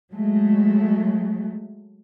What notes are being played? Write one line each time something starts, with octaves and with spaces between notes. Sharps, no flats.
F#3 G#3 A3